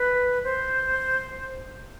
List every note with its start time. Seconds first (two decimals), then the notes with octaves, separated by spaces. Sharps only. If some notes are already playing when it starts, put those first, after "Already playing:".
Already playing: B4
0.44 C5